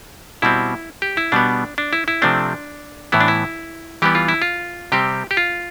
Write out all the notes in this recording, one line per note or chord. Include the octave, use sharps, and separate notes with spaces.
B2 G3 C4 E4
G4
E4
B2 G3 B3 D4
D4
E4
E4
C3 F3 A3 C4 D4
A2 E3 B3 E4
D4
E4
E3 G3 B3 G4
F4
E4
F4
C3 G3 C4 G4
G4
F4